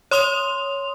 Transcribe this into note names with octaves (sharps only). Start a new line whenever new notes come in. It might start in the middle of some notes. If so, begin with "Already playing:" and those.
C#5 C6 D#6 F7